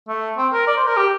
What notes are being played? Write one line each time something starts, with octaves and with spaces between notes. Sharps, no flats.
A3
C4
A#4
D5
C5
A#4
G4